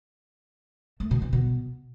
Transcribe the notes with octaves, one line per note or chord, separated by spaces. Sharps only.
A3
B2
E3
B2